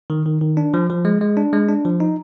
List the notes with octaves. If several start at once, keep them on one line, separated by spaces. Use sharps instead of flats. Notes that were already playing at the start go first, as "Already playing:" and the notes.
D#3
D#3
D#3
D4
F3
F3
G#3
G#3
D4
G#3
D4
F3
D#4